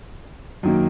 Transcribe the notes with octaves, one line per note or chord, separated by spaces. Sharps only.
F#2 D#3 A#3